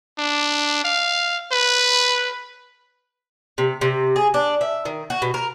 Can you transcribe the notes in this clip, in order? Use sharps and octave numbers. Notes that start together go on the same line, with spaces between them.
D4
F5
B4
C3
C3
G#4
D4
E5
D#3
F#4
B2
A#4